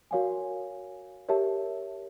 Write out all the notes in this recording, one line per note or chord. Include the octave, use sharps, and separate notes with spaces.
F#4 A#4 C#5 F5 G#5
G4 A#4 C#5 E5 A5